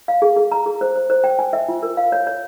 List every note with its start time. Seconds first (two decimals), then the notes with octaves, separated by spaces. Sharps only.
0.08 F5
0.22 G#4
0.36 G#4
0.52 A#5
0.66 G#4
0.81 C5
0.96 C5
1.10 C5
1.24 G5
1.39 G#5
1.53 E5
1.69 F4
1.83 A#4
1.97 F5
2.12 C#5
2.27 C#5